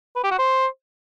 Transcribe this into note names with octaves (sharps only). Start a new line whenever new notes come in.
B4
G4
F#4
C5